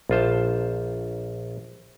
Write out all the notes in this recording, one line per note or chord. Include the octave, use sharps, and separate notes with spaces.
A#1 F4 C5 A5